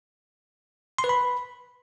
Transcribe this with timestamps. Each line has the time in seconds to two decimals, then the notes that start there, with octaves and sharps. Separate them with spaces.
0.98 C6
1.04 B4
1.09 B5